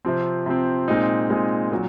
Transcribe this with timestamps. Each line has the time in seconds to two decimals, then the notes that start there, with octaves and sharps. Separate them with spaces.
0.05 C3 F3 C4
0.46 C3 F3 C4
0.88 A#2 G#3 C4 D#4
1.30 A#2 G#3 C4 D#4
1.71 A#2 F#3